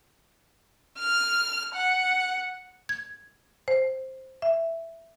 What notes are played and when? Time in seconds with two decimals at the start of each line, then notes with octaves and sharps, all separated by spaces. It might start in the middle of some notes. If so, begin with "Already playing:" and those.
1.00 F6
1.75 F#5
2.89 G#6
3.68 C5
4.42 E5